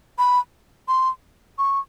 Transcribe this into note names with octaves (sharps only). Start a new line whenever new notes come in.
B5
C6
C#6